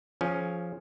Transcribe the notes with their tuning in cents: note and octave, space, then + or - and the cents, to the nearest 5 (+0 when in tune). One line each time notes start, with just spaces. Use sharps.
F3 +0 C#4 +0 G#4 +25